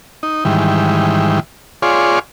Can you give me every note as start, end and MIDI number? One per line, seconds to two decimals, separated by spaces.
0.23 0.44 63
0.45 1.40 44
0.45 1.40 51
0.45 1.40 52
0.45 1.40 55
1.82 2.19 65
1.82 2.19 68
1.82 2.19 73
1.82 2.19 74
1.82 2.19 84